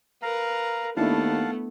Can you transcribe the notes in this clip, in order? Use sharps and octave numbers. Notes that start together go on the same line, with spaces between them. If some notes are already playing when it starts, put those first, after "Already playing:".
A#4 B4 F5 A#5
D#2 A3 B3 D4 E4 F5 F#5 A5